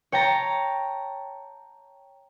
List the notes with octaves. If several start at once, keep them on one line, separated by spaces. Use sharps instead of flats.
C#5 G5 A5 A#5